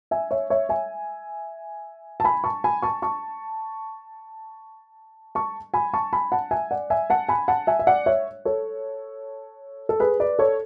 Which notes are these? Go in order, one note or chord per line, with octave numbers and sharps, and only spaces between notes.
E5 G#5
C#5 E5
C#5 E5
E5 G#5
A5
G#5 B5
A5 C#6
G#5 B5
A5 C#6
A5 C#6
A5 C#6
G#5 B5
A5 C#6
G#5 B5
F#5 A5
E5 G#5
D5 F#5
E5 G#5
F#5 A5
G#5 B5
F#5 A5
E5 G#5
E5
D5 F#5
C#5 E5
A4 C#5
A4
G#4 B4
B4 D5
A4 C#5